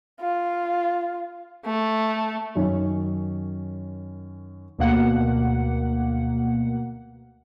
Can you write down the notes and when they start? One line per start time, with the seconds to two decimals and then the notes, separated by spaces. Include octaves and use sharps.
0.20 F4
1.66 A3
2.55 F#2 D#3 C#4
4.78 D2 B2 A#3 F#5